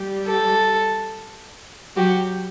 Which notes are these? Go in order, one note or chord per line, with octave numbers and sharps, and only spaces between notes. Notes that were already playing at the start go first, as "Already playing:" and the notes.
Already playing: G3 G4
A4
F#3 F#4 G4